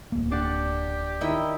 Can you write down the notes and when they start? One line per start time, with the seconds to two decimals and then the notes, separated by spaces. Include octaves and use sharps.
0.12 D1 A#3
0.31 D4 G4 D5 F#5
1.21 D#3 E4 G5